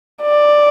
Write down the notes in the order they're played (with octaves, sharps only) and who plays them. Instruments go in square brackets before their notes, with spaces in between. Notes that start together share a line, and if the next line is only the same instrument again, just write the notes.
[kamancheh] D5